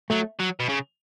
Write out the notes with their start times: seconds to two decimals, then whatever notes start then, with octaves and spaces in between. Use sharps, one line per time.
0.10 F#3 A3
0.39 F#3
0.60 B2
0.69 C#3